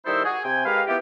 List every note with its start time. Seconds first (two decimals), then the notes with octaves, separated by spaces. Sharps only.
0.05 D#3 G3 D#4 E4 A4 C5
0.24 F#4 G#4
0.44 C3 G5 G#5
0.65 G#3 G4 A#4 B4 F5
0.87 B3 E4 F4 G4